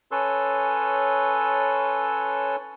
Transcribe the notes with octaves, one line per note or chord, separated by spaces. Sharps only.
C#4 A4 B4 C#5 C6 E6